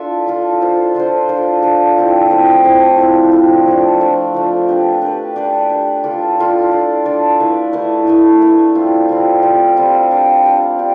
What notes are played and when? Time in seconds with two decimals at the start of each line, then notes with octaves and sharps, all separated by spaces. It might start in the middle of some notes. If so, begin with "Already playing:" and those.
Already playing: D4 F4 A4 E5
0.26 D4 F4 A4 E5
0.61 D4 F4 A4 C5
0.95 D4 F4 A4 C5
1.28 D4 F4 A4 C5
1.62 D4 F4 A4 C5
1.97 F3 A3 C4 E4
2.31 F3 A3 C4 E4
2.64 F3 A3 C4 E4
2.99 F3 A3 C4 E4
3.32 F3 A3 D4
3.66 F3 A3 D4
4.00 F3 A3 D4
4.34 F3 A3 D4
4.68 D4 G4 B4
5.02 D4 G4 B4
5.36 D4 G4 B4
5.70 D4 G4 B4
6.04 D4 F4 A4 D5
6.38 D4 F4 A4 D5
6.71 D4 F4 A4 D5
7.05 D4 F4 A4 D5
7.40 A3 E4 B4 E5
7.73 A3 E4 B4 E5
8.07 A3 E4 B4 E5
8.41 A3 E4 B4 E5
8.75 G3 C4 F4
9.09 G3 C4 F4
9.43 G3 C4 F4
9.77 G3 C4 F4
10.11 D4 G4 D5 F5
10.45 D4 G4 D5 F5
10.79 D4 G4